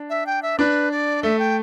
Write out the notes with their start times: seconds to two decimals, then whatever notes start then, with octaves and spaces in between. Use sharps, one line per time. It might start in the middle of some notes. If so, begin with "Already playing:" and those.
Already playing: D4
0.10 E5
0.26 G5
0.42 E5
0.59 D4 B4
0.92 D5
1.23 A3 E5
1.39 G5